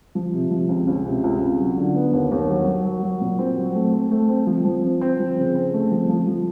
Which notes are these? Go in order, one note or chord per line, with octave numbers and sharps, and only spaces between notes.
F3
C3
F3
C#2
C#2
C3
C#2
C#2
F#3
D3
B3
D#2
D#2
F#3
F#3
F#3
F#3
A#2
C4
F#3
A3
C4
A3
C4
F3
F3
C4
C4
F3
C#3
C4
A3
F3
F3
F3